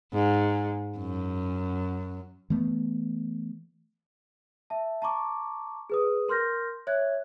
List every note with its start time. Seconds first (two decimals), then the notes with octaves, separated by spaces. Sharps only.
0.14 G#2
0.98 F#2
2.50 E3 A3 B3
4.70 E5 A5
5.02 A5 A#5 C#6 D6
5.90 G#4 B4 D#6
6.28 A#4 C6 F6 G6 A#6
6.87 C#5 E5 F#6 G#6